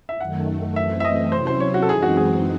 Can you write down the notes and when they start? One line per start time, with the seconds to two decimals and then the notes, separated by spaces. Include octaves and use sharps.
0.09 E5
0.20 F#2 D#3 A3 F#5
0.76 F#2 E3 A3 C4 E5
1.00 E5
1.05 D#5
1.32 C3 F#3 C#4 E4 C5
1.47 C5
1.60 C#5
1.74 F#4
1.82 A4
1.89 F#2 E3 G#3 C4 D#4 G#4
2.03 F#4
2.17 G#4